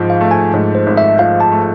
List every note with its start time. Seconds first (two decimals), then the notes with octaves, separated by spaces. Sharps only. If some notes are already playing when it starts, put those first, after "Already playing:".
Already playing: G#1 G#2 F3
0.10 F5
0.21 A3
0.31 G#5
0.53 G#2
0.75 C5
0.86 G#1
0.97 E5
1.19 F3 F5
1.40 A5
1.52 A3